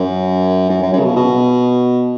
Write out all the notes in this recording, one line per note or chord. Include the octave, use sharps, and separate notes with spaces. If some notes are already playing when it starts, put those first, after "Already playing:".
Already playing: F#2
F#2
F#2
F#2
C#3
B2
B2